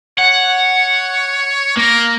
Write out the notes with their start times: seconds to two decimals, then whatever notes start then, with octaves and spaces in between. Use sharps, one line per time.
0.19 C#5 F#5
1.77 A#3 A#4